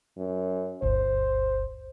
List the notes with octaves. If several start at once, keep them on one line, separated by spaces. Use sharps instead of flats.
F#2
G1 D2 C5